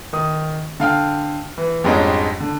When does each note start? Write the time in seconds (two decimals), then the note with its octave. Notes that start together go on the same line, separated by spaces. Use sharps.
0.13 D#3 D#6
0.80 D3 F5 G5 F6
1.58 E3
1.84 F2 G#2 G3 G#3 C#4 D4
2.40 D3